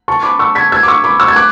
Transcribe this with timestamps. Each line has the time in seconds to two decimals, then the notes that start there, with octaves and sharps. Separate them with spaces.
0.08 A5 C#6
0.23 B5 D6
0.39 C#6 E6
0.55 G#6 B6
0.72 E6 G#6
0.83 D6
0.88 C#6 E6
1.04 B5 D6
1.20 C#6 E6
1.28 G#6
1.36 D6 F#6